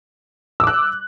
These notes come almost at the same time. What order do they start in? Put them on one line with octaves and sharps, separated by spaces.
E6 D6 F#6